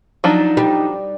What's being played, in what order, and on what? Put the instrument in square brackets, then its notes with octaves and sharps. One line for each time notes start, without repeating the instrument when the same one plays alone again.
[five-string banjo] F3 F#3 D4 [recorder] D#4
[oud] G3